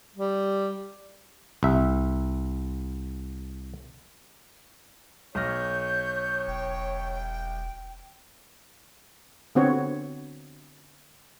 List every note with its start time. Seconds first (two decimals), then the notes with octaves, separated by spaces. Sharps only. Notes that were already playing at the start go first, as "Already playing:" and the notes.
0.16 G3
1.63 C2 E5
5.35 B1 C#5 F6 G6 A#6
6.48 E1 G5
9.55 D3 B3 C4 F#4 C#5